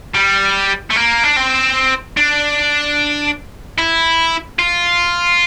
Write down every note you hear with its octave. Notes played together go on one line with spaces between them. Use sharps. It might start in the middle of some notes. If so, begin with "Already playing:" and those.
G3
A3
A#3
D4
C4
D4
E4
F4